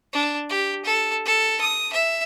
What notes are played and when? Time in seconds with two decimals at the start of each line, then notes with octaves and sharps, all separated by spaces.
0.13 D4
0.49 G4
0.84 A4
1.26 A4
1.61 D#6
1.93 E5